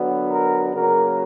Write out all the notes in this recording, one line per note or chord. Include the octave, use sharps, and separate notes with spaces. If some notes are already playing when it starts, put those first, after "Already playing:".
Already playing: D3 F#3 B3
A#4
C#3 F#3 A#3 A#4